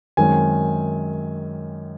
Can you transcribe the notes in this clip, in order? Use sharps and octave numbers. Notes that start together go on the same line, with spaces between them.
F#2 D#3 G#3 C4 G#5